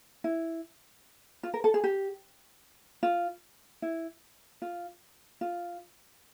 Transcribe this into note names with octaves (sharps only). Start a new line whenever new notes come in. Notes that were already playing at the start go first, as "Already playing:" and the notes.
E4
F4
A#4
A4
G#4
G4
F4
E4
F4
F4